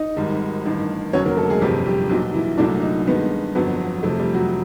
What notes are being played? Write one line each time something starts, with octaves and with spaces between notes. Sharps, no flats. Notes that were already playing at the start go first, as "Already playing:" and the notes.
Already playing: D#4 D#5
G#1 G#2 D#3 G3
A1 G2 D#3
F1 D#2 D3 F#3 C#4 C#5
A#3 A#4
A3 A4
G#3 G#4
G1 F2 C3 G3 G4
G3 G4
B1 A#2 F3 F#3 F#4
E3 E4
C2 A#2 F#3 A3 D4
D#4
G2 D#3 G#3 B3
G1 F2 D3 F#3 B3
F2 C3 F3 A3
G3 G4
F#3 F#4